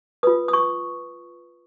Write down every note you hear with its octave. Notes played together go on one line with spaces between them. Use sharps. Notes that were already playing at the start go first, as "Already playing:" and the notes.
F4 B4 D#6
D#6
C#6